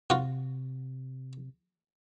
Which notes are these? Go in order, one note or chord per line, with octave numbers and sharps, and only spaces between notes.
C3 F4 F#4